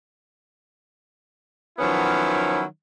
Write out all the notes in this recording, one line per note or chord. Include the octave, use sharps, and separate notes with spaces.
D#3 F3 F#3 B3 C#4 E4